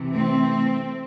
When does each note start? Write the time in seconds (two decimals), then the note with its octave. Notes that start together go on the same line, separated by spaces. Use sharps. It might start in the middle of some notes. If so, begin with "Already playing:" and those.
Already playing: C3 E3
0.12 A3 C4